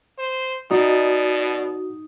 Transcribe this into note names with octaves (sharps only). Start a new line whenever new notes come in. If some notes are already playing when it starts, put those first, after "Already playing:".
C5
B2 D#4 F#4 D5